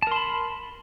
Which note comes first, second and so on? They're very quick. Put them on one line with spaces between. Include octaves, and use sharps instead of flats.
A5 A#4 C6 B5